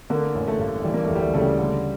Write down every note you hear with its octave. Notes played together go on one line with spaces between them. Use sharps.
D3 A#3
A1
A3
G2
E3 G3
A#3
A3
D2
G3
A3
C#3 A3
G3
D3